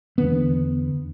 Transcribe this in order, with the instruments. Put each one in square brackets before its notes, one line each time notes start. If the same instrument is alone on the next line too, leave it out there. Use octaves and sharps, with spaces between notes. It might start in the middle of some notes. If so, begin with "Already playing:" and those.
[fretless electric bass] E2 D3 B3